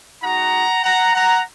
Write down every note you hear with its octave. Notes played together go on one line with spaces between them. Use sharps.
G#3 D#4 F#4 F#5 A#5
F#5 A#5
F#5 A#5